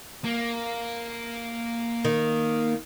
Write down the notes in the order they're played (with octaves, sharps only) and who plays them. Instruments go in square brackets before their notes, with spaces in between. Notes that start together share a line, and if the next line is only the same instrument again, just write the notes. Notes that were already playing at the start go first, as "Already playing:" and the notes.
[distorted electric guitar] A#3
[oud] D#3